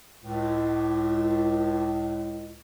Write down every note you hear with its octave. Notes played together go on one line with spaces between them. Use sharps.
C#2 A2